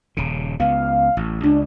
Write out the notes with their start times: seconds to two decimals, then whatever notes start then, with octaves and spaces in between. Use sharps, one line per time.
0.17 D#1 C#3
0.60 C#2 B3 F5
1.17 A1
1.44 C#2 D4